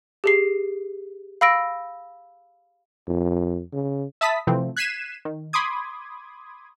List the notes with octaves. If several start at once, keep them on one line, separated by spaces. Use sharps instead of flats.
G4 G#4 C7
F5 B5 E6 A#6 D7
F2
C#3
E5 A5 B5 D#6 B6
C3 E3 F3 A3 C4
F#6 G#6 B6 C7 D#7 E7
D#3
B5 C6 D6 D#6 G#6